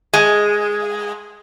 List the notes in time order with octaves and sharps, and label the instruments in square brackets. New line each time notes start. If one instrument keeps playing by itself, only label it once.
[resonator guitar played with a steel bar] G#3